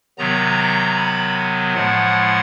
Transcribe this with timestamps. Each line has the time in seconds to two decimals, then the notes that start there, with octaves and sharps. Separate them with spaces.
0.18 C3 D#3 F#3 B3 A#5
0.97 B5
1.74 A2 F3 G#3 F#5